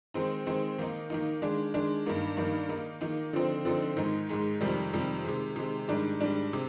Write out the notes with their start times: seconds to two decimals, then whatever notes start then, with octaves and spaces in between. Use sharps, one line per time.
0.14 D#3 G#3 C4 D#4
0.47 D#3 G#3 C4 D#4
0.78 D#3 A#3 D#4
1.10 D#3 A#3 D#4
1.42 D#3 G#3 D4
1.74 D#3 G#3 D4
2.06 G2 D#3 A#3 D#4
2.37 G2 D#3 A#3 D#4
2.69 D#3 A#3 D#4
3.01 D#3 A#3 D#4
3.33 D3 F3 C4 D#4
3.65 D3 F3 C4 D#4
3.97 G#2 D#3 G#3 D#4
4.29 G#2 D#3 G#3 D#4
4.61 F2 C3 D#3 G3
4.93 F2 C3 D#3 G3
5.25 C3 D#3 G#3
5.56 C3 D#3 G#3
5.88 G#2 D#3 G3 D4
6.21 G#2 D#3 G3 D4
6.53 C3